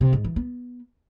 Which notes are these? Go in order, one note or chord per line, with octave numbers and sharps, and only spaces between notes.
C3
G#2
E3
B3